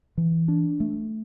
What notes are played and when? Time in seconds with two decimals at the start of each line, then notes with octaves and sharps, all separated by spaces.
0.18 E3
0.48 D4
0.80 A3